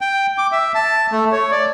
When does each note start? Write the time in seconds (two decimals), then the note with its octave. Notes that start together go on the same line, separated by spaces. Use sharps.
0.01 G5
0.38 D6
0.52 E5
0.75 A5
1.12 A3
1.32 C#5
1.51 D5